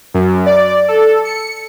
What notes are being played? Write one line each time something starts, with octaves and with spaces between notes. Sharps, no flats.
F#2
D5
A4
C#7